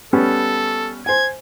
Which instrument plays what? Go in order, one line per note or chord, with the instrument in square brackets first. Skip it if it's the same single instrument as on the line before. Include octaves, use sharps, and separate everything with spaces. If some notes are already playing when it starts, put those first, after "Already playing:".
[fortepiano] G3 B3 C#4 [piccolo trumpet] A4
[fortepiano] C5 G#5 [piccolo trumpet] G#6